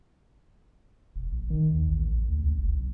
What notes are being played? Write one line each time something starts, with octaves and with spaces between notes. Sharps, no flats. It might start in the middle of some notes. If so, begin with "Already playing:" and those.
E1
A#1
D#3
D#2
A1
A#1
D2
C#2
F#1
B1